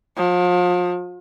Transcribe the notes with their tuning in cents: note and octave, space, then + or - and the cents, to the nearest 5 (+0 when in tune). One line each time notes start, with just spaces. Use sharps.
F3 +35